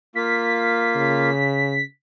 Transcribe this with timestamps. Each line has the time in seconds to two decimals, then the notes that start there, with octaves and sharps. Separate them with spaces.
0.15 A#3 F4 F5 B6
0.96 C#3